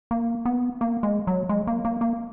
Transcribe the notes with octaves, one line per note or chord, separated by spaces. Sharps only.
A#3
B3
A#3
G#3
F#3
G#3
A#3
A#3
A#3